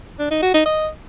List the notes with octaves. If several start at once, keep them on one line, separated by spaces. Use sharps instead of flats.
D4
D#4
F#4
D#4
D#5